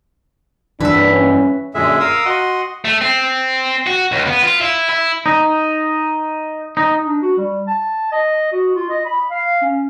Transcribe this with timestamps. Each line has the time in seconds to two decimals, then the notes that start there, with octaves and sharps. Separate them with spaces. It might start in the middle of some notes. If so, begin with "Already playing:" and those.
0.80 G2 E3 D4 B4 E5
1.11 C#4
1.75 F#2 A#2 D3 G#3 G#4 E5
2.00 A#4 F5 D#6 E6
2.26 F#4 D#5 F#5 C6
2.85 A3
3.01 C4
3.87 F#4
4.12 C#2
4.27 B3
4.43 F4
4.61 E4
4.90 E4
5.26 D#4
6.77 D#4
7.05 D4
7.22 F#4
7.37 G3
7.67 A5
8.12 D#5
8.52 F#4
8.76 F4
8.89 D#5
9.05 B5
9.30 F5
9.62 C#4